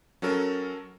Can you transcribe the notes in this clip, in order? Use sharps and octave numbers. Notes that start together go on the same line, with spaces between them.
F#3 C#4 F#4 A4 A#4